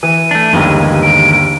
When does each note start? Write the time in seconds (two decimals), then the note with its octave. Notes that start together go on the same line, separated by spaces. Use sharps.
0.03 E3 D#7
0.31 A3 D4
0.53 G1 D#2 D#3 E3 G#3
1.03 D7